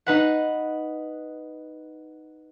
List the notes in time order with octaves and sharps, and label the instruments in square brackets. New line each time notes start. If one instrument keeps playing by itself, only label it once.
[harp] D#4 B4 F#5